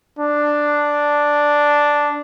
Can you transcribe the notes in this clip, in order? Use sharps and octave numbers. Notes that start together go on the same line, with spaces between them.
D4